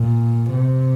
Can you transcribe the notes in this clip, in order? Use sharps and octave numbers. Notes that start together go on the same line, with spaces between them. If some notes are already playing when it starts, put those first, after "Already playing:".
Already playing: A#2
C3